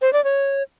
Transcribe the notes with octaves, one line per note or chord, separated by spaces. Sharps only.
C5
D5
C#5